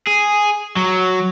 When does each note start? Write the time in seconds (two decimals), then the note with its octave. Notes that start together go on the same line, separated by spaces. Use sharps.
0.07 G#4
0.76 F#3